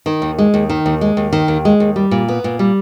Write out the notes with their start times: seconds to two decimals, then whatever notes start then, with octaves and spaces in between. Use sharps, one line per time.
0.06 D#3
0.22 D#2
0.38 G#3
0.54 D#2
0.69 D#3
0.86 D#2
1.01 G#3
1.17 D#2
1.33 D#3
1.48 D#2
1.65 G#3
1.80 D#2
1.96 G3
2.11 A#2
2.28 B3
2.44 A#2
2.59 G3